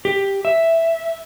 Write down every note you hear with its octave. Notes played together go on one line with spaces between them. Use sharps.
G4
E5